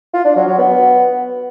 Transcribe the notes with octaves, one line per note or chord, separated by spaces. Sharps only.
F4
D4
F#3
F#3
B3